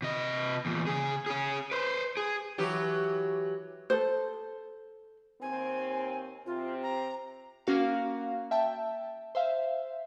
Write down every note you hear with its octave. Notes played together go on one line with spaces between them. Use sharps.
C3 D#5
E2 A#2
C#3 G#4
C#4 G#4
B4 C5
G#4
E3 F#3 G4
A4 C5
D#2 C4 G#5
C3 C4 F4
A#5
A#3 C#4 F#4 F5
E5 G5 A5
C5 E5 F5